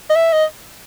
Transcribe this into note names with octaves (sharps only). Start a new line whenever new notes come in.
D#5
E5
D#5